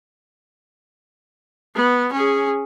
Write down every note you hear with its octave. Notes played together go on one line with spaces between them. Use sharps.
B3
C#4 G#4